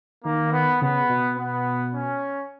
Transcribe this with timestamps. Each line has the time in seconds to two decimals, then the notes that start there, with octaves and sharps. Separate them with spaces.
0.24 D#3 A#3
0.52 B3
0.81 C#3 B3
1.09 B2
1.37 B3
1.94 C#4